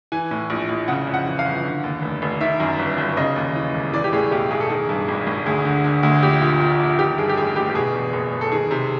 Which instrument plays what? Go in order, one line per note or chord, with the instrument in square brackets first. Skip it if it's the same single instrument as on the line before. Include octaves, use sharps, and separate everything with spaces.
[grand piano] E3 G#5
A2
A#1
A#1
C#3 F#5
F2
F#5
E3
F5
G1
D3
D#2
F1
F1
D#3 E5
F#2
G1
G1
C#3 D#5
D#2
E3
E1
E3 D5
G4
A2 G#4
B1 G4
B1 G#4
A4
D#3 G#4
G2
G#1
G#1
D2 G#4
D3
D3
D2
A#1 G4
A#2
A#2
A#1
D#3 G4
G2 G#4
G4
A1 G#4
A1 G4
G4
B2 G#4
E2
F#1
F#1
A4
D#3 G#4
C3